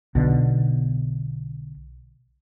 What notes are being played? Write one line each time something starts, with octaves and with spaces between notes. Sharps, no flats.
B1 B2 D3